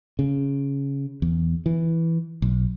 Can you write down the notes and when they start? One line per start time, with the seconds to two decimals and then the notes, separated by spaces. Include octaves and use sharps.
0.19 C#3
1.22 E2
1.66 E3
2.42 B1